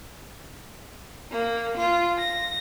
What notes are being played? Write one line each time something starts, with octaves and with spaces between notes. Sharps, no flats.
A#3
F4
A#6